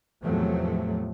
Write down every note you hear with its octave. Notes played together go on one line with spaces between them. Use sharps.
E2 A2 C3 F3 F#3 A3